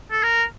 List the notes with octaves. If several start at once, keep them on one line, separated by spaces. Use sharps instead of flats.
A4
A#4